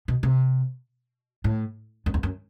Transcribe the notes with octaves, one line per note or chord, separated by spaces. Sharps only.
B2
C3
A2
F#2
E2
F#2